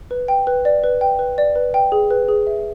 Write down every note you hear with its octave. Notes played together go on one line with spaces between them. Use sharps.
B4
G5
B4
D5
B4
G5
B4
D5
B4
G5
G#4
B4
G#4
E5